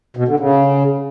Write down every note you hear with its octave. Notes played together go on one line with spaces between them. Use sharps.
B2
D3
C#3